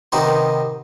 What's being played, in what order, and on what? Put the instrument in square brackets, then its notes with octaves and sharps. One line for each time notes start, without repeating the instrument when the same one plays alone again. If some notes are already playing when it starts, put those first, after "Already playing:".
[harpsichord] C3 D#3 B3 D#4 C5